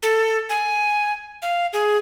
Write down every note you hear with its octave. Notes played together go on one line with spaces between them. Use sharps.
A4
G#5
F5
G#4